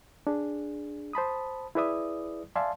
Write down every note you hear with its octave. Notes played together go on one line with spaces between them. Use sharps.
D4 G#4
C5 A5 B5 D#6
E4 G#4 B4 D5 E5 D#6
D5 E5 F5 G#5 A5 C6